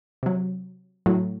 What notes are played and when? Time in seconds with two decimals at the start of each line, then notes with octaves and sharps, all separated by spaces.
0.23 C3 F#3
1.06 A2 F#3